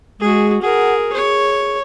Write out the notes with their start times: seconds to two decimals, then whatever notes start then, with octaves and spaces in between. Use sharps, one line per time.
0.20 G#3 F#4 G#4
0.62 G#4 A#4 F#5
1.13 G#4 C#5